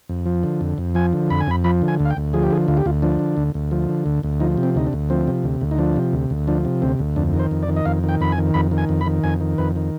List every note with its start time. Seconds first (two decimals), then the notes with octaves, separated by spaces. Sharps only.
0.09 F2
0.26 F3
0.43 D3
0.61 F2
0.78 F2
0.95 F3 G#5
1.13 D3
1.30 F2 B5
1.40 G#5
1.47 F2 B5
1.64 F3 B5
1.82 D3
1.88 G#5
2.00 D2
2.05 F5
2.10 G5
2.17 D2
2.33 F3 G#4
2.43 G4
2.50 D3 G#4
2.68 D2 F4
2.77 G4
2.85 D2 F4
3.02 F3 D4
3.19 D3
3.37 D2
3.54 D2
3.71 F3
3.89 D3
4.06 D2
4.23 D2
4.40 F3 D#4
4.57 C3
4.63 C4
4.75 D2 D#4
4.87 D4
4.93 D2
5.10 F3 C4
5.27 C3
5.44 D2
5.61 D2
5.71 D#4
5.78 F3 D4
5.96 C3
6.13 D2
6.30 D2
6.48 F3 D4
6.65 C3
6.82 D2 C4
6.99 D2
7.16 F2 D4
7.33 D#3
7.39 C5
7.51 F2
7.63 D5
7.68 D#3
7.76 D#5
7.85 F2 F5
8.03 D#3
8.09 G5
8.21 F2 B5
8.32 G#5
8.38 D#3
8.54 F2 B5
8.71 D#3
8.78 G#5
8.89 F2
9.01 B5
9.06 D#3
9.24 F2 G#5
9.40 D#3
9.58 F2 B4
9.76 D#3